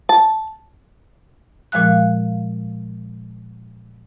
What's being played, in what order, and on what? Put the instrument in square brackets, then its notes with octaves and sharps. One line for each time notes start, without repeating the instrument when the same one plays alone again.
[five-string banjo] A5
[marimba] A#2 F3 G#3 F5 F#6